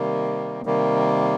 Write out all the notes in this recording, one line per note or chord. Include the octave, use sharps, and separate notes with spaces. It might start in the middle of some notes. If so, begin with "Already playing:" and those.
Already playing: C3 D#3 G3 A#3
C3 D#3 G3 A#3